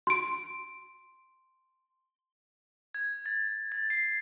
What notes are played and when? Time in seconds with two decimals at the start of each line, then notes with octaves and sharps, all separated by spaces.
0.07 C6 D7
2.95 G#6
3.26 A6
3.72 A6
3.90 C7